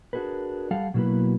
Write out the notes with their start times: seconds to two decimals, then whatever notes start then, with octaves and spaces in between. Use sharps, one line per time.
0.13 D4 F#4 G#4 A#4 B4
0.71 G3 A4 F5 F#5
0.94 B2 F#3 A#3 E4 F#4 B4